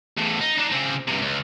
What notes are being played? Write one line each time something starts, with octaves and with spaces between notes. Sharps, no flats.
E2 A2
D#4
D4 D#4
C#3 C4
G2 C3
C#2